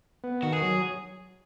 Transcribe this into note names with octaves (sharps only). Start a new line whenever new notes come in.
B3
D#3 F#4
G#4
F#3